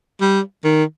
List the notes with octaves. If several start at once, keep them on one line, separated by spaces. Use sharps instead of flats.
G3
D#3